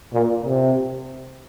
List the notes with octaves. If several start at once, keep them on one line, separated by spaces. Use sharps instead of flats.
A#2
C3